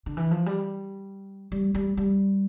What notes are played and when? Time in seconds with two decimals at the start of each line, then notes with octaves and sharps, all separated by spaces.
0.06 D3
0.17 E3
0.31 F3
0.46 G3
1.52 G3
1.75 G3
1.97 G3